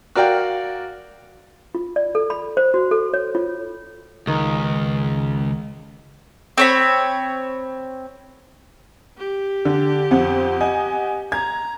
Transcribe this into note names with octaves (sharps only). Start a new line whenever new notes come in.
F#4 A#4 D5 F5 G5
F4
D5
A4
B5
C5
F#4
A4
C#5
F4
C#2 D#3
C4 C#5 B5
G4
D3
F2 C4 F#5
D#5 F#5 G#5
A#5 G#6